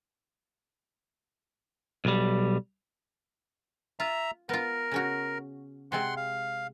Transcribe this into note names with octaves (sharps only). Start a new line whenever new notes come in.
B1 G3
F4 E5 A#5
B3 F4 A#4
C#3 C#4 F#4
C3 G#3 C4 F#5 C6
F5